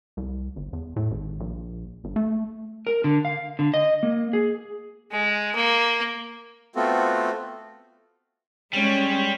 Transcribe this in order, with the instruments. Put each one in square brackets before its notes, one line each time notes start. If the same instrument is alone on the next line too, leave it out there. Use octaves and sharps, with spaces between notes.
[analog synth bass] C2
G1
E2
A2
G#1
A#1
G1
A3
[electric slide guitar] A#4
D3
F5
D3
D#5
A#3
G#4
[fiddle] G#3
A#3
[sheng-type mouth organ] A3 B3 C4 F4 F#4 A4
[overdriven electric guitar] G3 [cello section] G#3 C#4